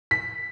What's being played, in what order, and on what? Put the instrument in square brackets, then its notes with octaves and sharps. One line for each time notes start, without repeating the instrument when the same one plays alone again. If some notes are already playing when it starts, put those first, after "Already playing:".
[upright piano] B6